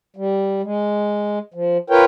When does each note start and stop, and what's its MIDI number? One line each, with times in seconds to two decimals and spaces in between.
0.16 0.62 55
0.63 1.39 56
1.54 1.78 53
1.90 2.05 65
1.90 2.05 70
1.90 2.05 71
1.90 2.05 73
1.90 2.05 79